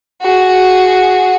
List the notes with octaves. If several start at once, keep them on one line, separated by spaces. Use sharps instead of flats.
F#4 G#4